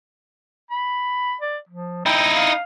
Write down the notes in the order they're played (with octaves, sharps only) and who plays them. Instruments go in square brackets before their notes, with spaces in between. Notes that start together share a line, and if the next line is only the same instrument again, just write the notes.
[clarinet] B5
D5
F3
[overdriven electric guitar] D#4 E4 [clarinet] G5
[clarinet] F5